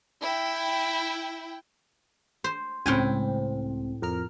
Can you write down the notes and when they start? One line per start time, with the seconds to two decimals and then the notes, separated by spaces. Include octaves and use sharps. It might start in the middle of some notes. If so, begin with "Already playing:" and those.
0.22 E4 G5
2.44 C5
2.86 C#2 A2 C4 G5 G#5
4.02 F2 A#4 F6